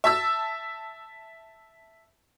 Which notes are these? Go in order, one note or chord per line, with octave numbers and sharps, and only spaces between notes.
E5 A5 E6